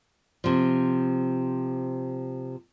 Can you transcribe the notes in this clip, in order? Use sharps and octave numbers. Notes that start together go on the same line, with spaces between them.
C3 F3